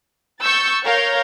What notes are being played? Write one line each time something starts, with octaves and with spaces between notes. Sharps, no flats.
C#6 E6 G6 A6
A#4 C#5 F5 G6